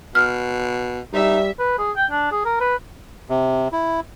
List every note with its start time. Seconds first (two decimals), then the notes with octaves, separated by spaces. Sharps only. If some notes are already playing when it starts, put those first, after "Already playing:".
0.15 B2 F6
1.13 G3 D#4 E5
1.59 B4
1.78 G#4
1.96 G5
2.10 D4
2.31 G#4
2.45 A#4
2.60 B4
3.29 C3
3.72 E4